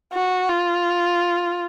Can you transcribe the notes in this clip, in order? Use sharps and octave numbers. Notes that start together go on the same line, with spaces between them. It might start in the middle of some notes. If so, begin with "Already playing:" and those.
F#4
F4